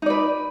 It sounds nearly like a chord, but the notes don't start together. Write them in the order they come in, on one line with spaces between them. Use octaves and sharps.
D#4 D5 B4